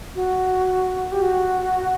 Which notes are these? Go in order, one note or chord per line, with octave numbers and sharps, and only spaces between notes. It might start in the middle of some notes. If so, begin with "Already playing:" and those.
F#4
G4
F#4